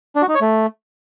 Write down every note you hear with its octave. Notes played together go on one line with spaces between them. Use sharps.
D4
F#4
D#4
C#5
A3